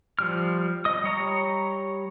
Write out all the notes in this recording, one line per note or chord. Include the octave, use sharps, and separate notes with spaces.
F3 G3 F6
D#5 D#6
G3 C#5 A#5